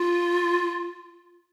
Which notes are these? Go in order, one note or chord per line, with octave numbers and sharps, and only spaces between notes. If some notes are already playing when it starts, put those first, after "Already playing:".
Already playing: F4